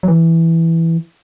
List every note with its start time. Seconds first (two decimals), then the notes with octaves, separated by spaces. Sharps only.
0.03 F#3
0.08 E3